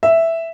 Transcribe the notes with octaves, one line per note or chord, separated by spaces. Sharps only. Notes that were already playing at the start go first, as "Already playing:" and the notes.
E5